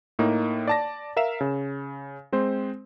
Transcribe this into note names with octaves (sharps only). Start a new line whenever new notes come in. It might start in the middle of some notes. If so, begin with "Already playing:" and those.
A2 A#3 D#4
D5 A5 A#6
A#4 E5 F5 E7
C#3
G#3 C4 C5